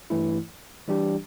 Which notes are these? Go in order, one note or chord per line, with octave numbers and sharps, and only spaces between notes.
G2 E3 A3 E4
E3 G3 D4 G4